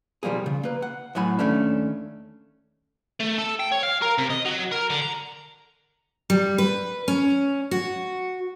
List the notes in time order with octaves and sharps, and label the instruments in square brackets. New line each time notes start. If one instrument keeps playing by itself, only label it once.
[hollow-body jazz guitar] B1 F3 G3 A#3 G#4
C#3
A#3 B4
F#5
A2 F#3 F#5 G#5 B5
D#2 A3 C#4 D4
[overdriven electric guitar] A3
A4
G5
C#5
F5
A#4
C3
D#5
F#3
A#4
D3
A#5
[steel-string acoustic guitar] G3
B4
C#4
F#4